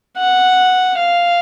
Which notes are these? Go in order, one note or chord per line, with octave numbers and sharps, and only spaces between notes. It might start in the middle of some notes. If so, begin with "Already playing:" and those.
F#5
F5